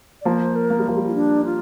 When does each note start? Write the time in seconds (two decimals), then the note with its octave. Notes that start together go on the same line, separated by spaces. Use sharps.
0.21 D5
0.25 F3 A#3 C5
0.56 A#4
0.70 A#3
0.79 G3
0.88 F3
0.97 G3
1.06 F4
1.14 D4
1.45 F4